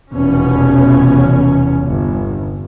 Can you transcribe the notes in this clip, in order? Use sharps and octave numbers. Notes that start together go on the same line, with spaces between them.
F1 E2 B2 C#4
G1